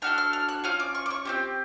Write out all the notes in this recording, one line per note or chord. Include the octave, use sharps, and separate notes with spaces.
D4 F#4 A4 F6
F6
F6
F#6
C#4 F4 F6
D6
C#6
D6
C#6
C4 E4 G4